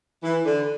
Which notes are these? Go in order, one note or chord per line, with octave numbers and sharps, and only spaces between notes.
E3
D3